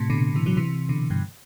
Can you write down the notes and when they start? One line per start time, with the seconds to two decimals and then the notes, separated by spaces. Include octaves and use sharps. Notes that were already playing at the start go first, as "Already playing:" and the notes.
Already playing: A2 C3
0.10 B2 D3
0.35 C3 E3
0.46 D3 F#3
0.57 C3 E3
0.89 B2 D3
1.10 G2 B2